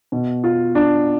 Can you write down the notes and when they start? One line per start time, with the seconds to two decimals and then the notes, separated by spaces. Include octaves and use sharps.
0.12 B2
0.44 F4
0.75 D4